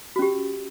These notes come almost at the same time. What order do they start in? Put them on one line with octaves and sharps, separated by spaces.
F#4 C#4 G4